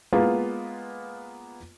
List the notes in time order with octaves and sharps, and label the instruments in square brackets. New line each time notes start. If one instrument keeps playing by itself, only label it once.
[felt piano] G#3 A#3 B3 F4